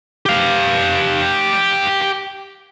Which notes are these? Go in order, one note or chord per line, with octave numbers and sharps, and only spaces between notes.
G4 F5